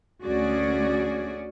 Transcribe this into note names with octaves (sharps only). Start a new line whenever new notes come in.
D2 A3 C#4 F#4 G#4 D5